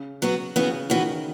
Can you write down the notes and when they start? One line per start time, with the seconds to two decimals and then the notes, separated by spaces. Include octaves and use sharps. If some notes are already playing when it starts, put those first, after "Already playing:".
Already playing: C#3
0.22 F#3 B3 F#4
0.56 C#3 E3 B3 F#4
0.90 D#3 E3 B3 F#4